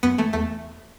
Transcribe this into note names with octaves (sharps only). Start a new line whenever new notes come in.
F#2 B3
E3 A3
E2 A3